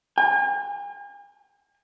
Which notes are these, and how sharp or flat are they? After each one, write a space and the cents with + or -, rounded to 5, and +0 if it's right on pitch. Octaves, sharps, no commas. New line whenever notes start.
G#5 -40